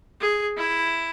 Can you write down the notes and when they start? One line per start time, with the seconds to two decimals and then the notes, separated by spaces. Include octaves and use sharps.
0.21 G#4
0.57 E4